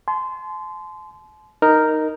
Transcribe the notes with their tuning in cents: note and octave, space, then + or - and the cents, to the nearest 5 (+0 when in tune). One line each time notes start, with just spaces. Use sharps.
A5 -45 C6 -15
D#4 +0 A#4 -5